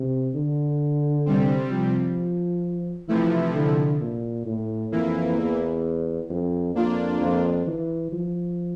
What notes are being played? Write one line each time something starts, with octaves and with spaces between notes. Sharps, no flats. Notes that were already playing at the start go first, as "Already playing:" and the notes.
Already playing: C3
D3
C3 G3 C4
F3
C3 E3 F3 A3 E4
D3
A#2
A2
F2 E3 A#3 E4
E2
F2
F2 A#3 D4 F4
F2
E3
F3